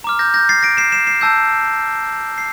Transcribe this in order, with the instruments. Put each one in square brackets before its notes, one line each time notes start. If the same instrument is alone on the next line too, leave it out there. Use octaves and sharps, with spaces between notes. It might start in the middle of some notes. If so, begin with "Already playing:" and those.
[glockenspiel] A#5 D6 F6
G6 A#6
G6 A#6
A6 C7
A#6 D7
C7 E7
C7 E7
C7 E7
A5 E6 G6
C7